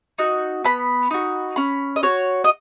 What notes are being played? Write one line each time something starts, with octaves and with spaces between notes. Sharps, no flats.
D#4 F#4
B3 B5
D#4 F#4
C#4 B5
D#5
F#4 C#5
D#5